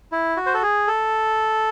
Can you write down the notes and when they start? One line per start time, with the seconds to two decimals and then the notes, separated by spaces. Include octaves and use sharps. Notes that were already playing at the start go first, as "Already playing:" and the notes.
0.12 E4
0.37 F#4
0.46 C5
0.54 A4
0.63 G#4
0.87 A4